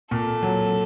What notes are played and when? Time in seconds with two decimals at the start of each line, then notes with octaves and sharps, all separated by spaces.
0.11 A#2 A4
0.42 F#3